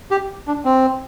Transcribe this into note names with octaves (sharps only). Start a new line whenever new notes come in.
G4
D4
C4